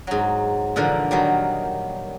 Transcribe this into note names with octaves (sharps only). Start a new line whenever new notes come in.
G#2 F#3
A#2 D3 E3 F3 A#3
D#3 F#3 G3